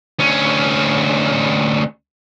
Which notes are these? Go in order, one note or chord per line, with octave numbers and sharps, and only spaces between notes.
D2 C#4